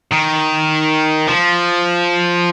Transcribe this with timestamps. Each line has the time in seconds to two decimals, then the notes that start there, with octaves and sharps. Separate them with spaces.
0.13 D#3
1.27 F3